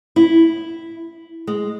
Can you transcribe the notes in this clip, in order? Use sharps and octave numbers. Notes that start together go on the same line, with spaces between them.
E4
G#3